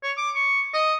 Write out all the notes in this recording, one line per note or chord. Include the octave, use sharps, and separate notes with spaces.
C#5
D6
C#6
D#5